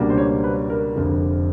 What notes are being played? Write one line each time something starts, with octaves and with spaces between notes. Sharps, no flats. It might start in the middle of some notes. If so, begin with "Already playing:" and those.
Already playing: C#2 B2 G3 A#3 D4
C5
C#5
B4
A#4
F1 F2 D3